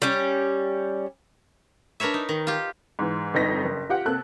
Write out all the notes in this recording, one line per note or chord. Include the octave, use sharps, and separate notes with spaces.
G3 C#4
D4 A#4 B4 C#5 E5
D#4
D#3
F4 G4
G#2 E3
G1 F2 D#4 A#6 B6
F#1
F4 G4 F#5
C3 A#3 A4 F#6